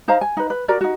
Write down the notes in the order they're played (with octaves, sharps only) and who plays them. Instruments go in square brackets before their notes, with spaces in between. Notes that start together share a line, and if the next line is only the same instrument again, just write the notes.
[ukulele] D#4 C5 F5 A#5
G#5
D#4 B4
B4
F#4 A#4 D5 A#5
D#4 F#4